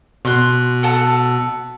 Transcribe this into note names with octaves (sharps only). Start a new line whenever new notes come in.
B2 C6 F#6
A4 F#5 A5